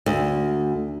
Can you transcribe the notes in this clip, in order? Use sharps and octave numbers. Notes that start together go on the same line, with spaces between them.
D2